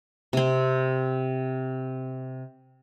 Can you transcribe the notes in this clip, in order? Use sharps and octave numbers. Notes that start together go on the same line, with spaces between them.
C3 C4